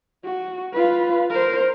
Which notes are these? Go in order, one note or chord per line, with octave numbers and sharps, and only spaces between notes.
F#4
F4 B4
A#4 C5